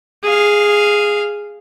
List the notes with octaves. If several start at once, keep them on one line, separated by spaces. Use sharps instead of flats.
G#4 F5